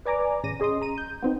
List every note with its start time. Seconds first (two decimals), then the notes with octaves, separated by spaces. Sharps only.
0.05 B4 D5 G#5 A#5 D6
0.43 A1 C#3 A#6 D#7
0.60 C#4 G#4 D#5 C6 D#6
0.82 A#5 D#7
0.98 G6
1.22 B3 C4 D#4